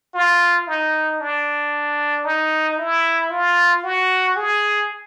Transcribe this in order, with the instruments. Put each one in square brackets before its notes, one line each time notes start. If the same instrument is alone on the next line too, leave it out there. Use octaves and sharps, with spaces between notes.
[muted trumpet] F4
D#4
D4
D#4
E4
F4
F#4
G#4